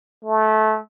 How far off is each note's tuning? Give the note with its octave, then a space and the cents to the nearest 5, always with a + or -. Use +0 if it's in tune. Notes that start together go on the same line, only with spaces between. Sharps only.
A3 -20